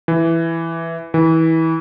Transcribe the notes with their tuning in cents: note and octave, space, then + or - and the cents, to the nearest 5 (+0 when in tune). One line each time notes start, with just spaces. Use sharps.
E3 +5
E3 -25